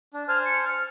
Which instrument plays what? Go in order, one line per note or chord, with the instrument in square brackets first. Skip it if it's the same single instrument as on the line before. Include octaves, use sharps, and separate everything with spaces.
[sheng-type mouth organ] D4
[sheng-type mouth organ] C5 G#5 A5 [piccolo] F6
[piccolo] C#7
F6